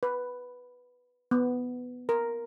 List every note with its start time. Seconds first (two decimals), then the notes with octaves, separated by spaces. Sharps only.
0.03 B4
1.31 B3
2.09 A#4